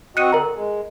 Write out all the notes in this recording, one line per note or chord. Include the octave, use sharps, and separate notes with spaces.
C4 F#4 D#5 F#6 C#7 D#7
D3 A#4 D#5 A#5
G#3